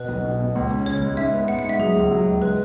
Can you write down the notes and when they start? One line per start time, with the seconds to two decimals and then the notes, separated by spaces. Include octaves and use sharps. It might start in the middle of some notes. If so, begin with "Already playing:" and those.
Already playing: B2 B4
0.09 B1
0.25 B2
0.40 B2
0.55 C#2
0.71 C#4
0.86 C#3 C#5
1.02 G#3
1.17 G#2 E5
1.33 B3
1.48 G#2 F#5
1.59 F#5
1.64 G#2
1.69 E5
1.79 F#3 G#4
1.96 C#2
2.11 F#3
2.27 C#2
2.42 G#3 B4